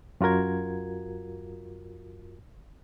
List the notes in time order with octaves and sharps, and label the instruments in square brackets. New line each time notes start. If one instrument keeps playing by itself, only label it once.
[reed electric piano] F#2 F4 F#4 A#4 G#6